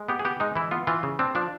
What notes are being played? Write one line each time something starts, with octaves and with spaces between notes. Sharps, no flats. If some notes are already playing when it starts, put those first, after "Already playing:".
Already playing: G#3
B3 G4
G#4
B3 G4
G#3 D#4
E3 E4
B3 F4
E3 F4
C#3
C4 D4
F3 D4